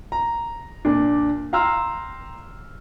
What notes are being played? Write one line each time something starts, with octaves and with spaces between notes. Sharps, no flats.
A#5
A#2 D4
F5 G5 A#5 C6 E6 F6